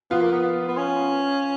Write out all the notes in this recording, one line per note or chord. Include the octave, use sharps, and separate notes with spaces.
F3 B3 F4
A#3
B3
B3
C#4